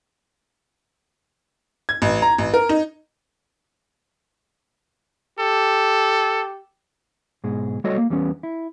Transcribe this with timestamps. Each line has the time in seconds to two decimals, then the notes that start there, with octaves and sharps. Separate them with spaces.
1.89 G#6
2.02 A1
2.22 A#5
2.38 A1
2.54 A#4
2.69 D#4
5.39 G4 A4
7.44 G#2 B2 G#4
7.84 G3 A3 F#4 A4 C#5 D#5
7.97 A#3
8.10 E2 G3 B3 C#4
8.43 E4